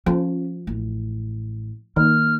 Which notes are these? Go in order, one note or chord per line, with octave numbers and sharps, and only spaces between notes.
F3 C#4
A1
D#3 A#3 F6